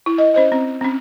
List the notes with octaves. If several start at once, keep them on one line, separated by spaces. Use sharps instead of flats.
E4
D#5
C#4 C5 D#5
C4
C4 C#4